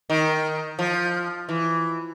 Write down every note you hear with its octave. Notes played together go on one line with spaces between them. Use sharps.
D#3
F3
E3